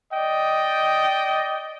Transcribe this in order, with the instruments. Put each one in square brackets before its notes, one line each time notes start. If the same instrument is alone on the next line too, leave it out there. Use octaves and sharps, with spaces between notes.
[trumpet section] D5 D#5 G5